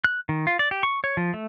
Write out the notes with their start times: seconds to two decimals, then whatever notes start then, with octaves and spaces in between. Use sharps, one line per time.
0.04 F#6
0.29 D#3
0.47 F4
0.59 D5
0.71 G4
0.83 C#6
1.04 C#5
1.17 F3
1.34 A3